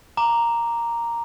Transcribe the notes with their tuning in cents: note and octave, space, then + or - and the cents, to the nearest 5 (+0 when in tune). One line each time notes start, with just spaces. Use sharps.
A#5 +0 D6 +0